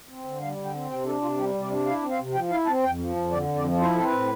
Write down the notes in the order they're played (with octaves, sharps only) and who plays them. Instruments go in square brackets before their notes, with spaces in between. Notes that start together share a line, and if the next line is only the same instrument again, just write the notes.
[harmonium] C4
D3
G3 F5
D3
G5
C4
C3 G5
D4 A4
C3 F4
G3 G4
C3
D5
D4
E4 F5
C4
F5
C3
F3 G5
E4 F5
C4 A5
F2 G5
F3
F2
D3 D5
F2
D5
F3
E4 C5
C4 A4
B4
A2